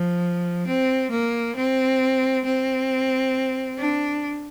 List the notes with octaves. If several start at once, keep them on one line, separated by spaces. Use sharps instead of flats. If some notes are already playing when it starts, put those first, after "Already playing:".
Already playing: F3
C4
A#3
C4
C4
D4